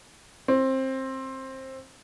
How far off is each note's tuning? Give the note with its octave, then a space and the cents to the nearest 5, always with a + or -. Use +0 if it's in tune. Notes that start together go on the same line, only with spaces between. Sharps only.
C4 +20